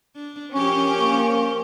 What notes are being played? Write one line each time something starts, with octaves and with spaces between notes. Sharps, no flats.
D4
F3 C#4 G4 A#4 C#6
A#3